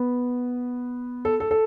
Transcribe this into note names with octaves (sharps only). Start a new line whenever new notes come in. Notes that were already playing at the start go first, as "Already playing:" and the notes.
Already playing: B3 B4
A4
A4
A4